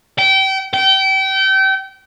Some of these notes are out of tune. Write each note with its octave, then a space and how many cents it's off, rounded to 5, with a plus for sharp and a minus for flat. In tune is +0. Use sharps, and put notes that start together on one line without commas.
G5 -30
G5 -30